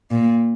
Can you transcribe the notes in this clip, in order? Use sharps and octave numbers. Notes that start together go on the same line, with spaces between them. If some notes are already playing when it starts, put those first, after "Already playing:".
A#2